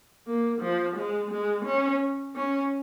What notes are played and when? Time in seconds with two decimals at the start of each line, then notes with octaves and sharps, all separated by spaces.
0.27 A#3
0.61 F3
0.97 G#3
1.31 G#3
1.65 C#4
2.36 C#4